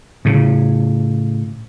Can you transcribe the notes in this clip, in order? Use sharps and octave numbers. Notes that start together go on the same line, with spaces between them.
A2 C#3